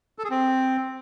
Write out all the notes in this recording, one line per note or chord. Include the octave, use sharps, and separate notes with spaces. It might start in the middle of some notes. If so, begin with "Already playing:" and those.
A4
G#4
C4